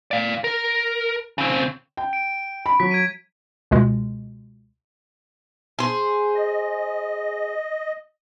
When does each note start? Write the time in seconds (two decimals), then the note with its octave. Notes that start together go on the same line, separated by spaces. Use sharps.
0.11 D5 F5
0.44 A#4
1.38 C#3 C4
1.97 G5
2.13 D7
2.66 B5
2.80 F#3 B6
2.91 G#6 D7 D#7
3.71 C#2 B2 G#3
5.79 G#4 C5
6.35 D#5